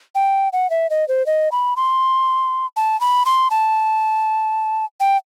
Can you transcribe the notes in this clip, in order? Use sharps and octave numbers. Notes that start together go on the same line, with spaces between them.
G5
F#5
E5
D#5
C5
D#5
B5
C6
A5
B5
C6
A5
G5